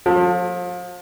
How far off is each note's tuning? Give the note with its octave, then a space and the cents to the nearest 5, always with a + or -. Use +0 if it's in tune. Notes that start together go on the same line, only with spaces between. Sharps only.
F3 +35 A4 +0